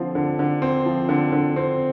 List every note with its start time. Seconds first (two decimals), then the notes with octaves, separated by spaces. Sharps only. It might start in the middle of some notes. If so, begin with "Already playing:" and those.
Already playing: D3 F3 C4
0.15 D3
0.39 D3
0.62 C4
0.86 F3
1.09 D3
1.32 D3
1.56 C4